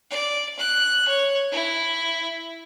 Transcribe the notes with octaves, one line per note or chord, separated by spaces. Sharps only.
D5
F#6
C#5
E4